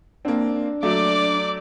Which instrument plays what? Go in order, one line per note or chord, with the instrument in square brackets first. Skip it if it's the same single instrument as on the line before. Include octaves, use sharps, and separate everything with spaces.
[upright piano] A#3 C4 [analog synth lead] D4
[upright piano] F#3 A3 [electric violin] D5 D6